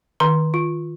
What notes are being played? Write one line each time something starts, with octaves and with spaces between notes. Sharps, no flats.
D#3 C6
F4